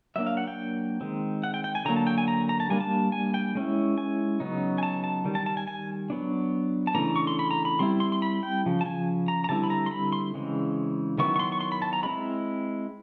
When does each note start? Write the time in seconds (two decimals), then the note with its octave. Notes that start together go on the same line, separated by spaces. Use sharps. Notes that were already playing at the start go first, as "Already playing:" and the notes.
0.16 F#3 A#3 D4 E5
0.27 F5
0.37 F#5
0.48 G5
1.01 D#3 G#3 C4
1.44 F#5
1.54 G5
1.64 G5
1.75 G#5
1.85 D3 F#3 A#3 A#5
1.96 A5
2.07 G5
2.18 G#5
2.28 A#5
2.49 A#5
2.60 A5
2.70 G3 A#3 D4 G#5
2.81 A5
3.12 G#5
3.34 G5
3.55 G#3 C#4 E4
3.98 G#5
4.40 C#3 F#3 B3 D#4
4.78 G#5
4.83 A5
5.04 A5
5.25 D#3 G3
5.35 A5
5.46 A5
5.57 G#5
5.67 G#5
6.10 F#3 B3 D4
6.87 A5
6.95 C#3 E3 A3 D4 A#5
7.16 C#6
7.27 C6
7.39 B5
7.51 A#5
7.65 B5
7.79 G3 C4 E4 C6
8.00 C6
8.12 C6
8.22 B5
8.43 G5
8.66 C#3 F3
8.81 A5
8.86 G#5
9.28 A#5
9.44 A#5
9.49 D3 G3 C4 E4 A5
9.64 B5
9.70 A#5
9.86 C6
9.91 B5
10.12 C6
10.34 C#3 E3 G#3 C4
11.18 D#3 F#3 B3 E4 C#6
11.36 C#6
11.40 C6
11.52 C#6
11.61 C6
11.72 B5
11.82 A5
11.93 A#5
12.03 G#3 C4 E4 B5